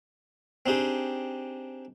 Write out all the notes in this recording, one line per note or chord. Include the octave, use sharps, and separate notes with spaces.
C4 D4 D#4 G4 G#4